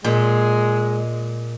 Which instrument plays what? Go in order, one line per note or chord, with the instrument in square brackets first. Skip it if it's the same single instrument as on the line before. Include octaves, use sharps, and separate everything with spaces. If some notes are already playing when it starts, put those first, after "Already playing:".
[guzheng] A#2 [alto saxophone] G#3